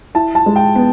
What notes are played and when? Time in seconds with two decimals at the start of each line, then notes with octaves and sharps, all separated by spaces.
0.15 E4 A5
0.35 A5
0.46 G#3
0.56 G5
0.76 B3